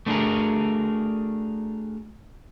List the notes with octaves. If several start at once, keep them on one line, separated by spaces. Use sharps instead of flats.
A3 B3 D4 F#4 G#4 A#4